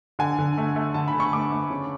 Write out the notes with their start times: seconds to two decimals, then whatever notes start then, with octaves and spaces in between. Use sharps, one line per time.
0.19 D3 G#5
0.39 D3
0.58 A3
0.76 A3
0.94 D3 A5
1.08 B5
1.14 D3
1.20 C#6
1.33 A3 D6
1.51 A3
1.70 C#3